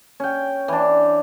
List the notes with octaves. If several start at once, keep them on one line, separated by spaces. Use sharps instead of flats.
C#4 G5
E3 D4